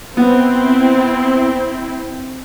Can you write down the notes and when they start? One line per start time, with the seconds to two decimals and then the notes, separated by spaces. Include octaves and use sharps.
0.17 B3 C4 E4